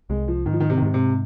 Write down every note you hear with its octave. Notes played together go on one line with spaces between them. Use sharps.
C2 G#3
F3
G#2 D#3
F3
D#3
C3
D#3
G#2 C3
C3